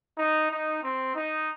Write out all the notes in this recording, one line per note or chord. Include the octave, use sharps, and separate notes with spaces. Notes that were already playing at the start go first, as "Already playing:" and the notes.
D#4
D#4
C4
D#4